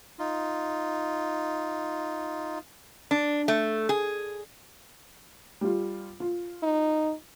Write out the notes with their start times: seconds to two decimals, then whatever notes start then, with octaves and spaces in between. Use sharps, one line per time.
0.19 D#4 F4
3.11 D4
3.48 A3
3.89 G#4
5.61 G3 F4
6.20 F4
6.63 D#4